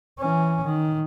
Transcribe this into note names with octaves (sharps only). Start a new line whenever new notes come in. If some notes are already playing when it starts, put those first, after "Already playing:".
E3 C#4
D#3